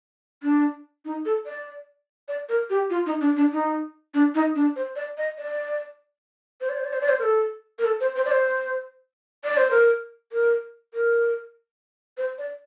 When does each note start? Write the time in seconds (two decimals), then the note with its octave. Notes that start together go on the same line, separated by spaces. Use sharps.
0.43 D4
1.05 D#4
1.25 A4
1.46 D5
2.28 D5
2.49 A#4
2.70 G4
2.90 F4
3.06 D#4
3.21 D4
3.37 D4
3.52 D#4
4.14 D4
4.35 D#4
4.55 D4
4.76 C5
4.96 D5
5.18 D#5
5.38 D5
6.61 C5
6.69 D5
6.77 C5
6.85 D5
6.93 C5
7.01 D5
7.09 C5
7.19 A#4
7.23 A4
7.79 A#4
7.85 A4
8.01 C5
8.16 C5
8.25 D5
8.31 C5
9.45 D5
9.57 C5
9.71 A#4
10.32 A#4
10.94 A#4
12.17 C5
12.38 D5